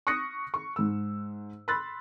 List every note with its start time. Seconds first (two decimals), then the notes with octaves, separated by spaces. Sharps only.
0.07 C#6 D#6 F#6 A#6 C#7
0.54 C#6
0.76 G#2 E6
1.68 B5 C6 E6 F#6 A6